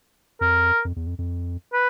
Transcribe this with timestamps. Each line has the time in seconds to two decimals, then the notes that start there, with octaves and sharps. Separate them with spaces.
0.41 F2 A#4
0.85 F2
0.96 E2
1.07 F2
1.18 F2
1.73 B4